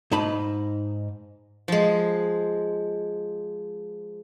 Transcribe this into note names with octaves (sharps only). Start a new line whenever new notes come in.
G#2 D#4 A5 B5
F3 G#3